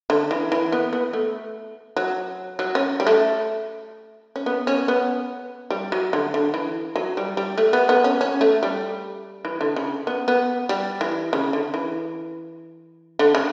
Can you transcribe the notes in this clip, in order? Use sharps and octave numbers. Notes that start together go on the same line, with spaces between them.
D3
E3
E3
B3
B3
A3
F#3
F#3
C#4
G3
A3
C#4
B3
C#4
B3
G3
F#3
D3
D3
E3
F#3
G3
G3
A3
B3
B3
C#4
C#4
A3
G3
E3
D3
C#3
B3
B3
G3
E3
C#3
D3
E3
D3
C#3